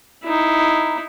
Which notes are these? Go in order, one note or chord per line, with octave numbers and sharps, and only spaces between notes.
D#4 E4